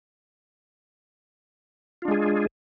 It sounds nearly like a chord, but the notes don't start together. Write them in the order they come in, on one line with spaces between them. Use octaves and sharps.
F4 D4 G#3 G#4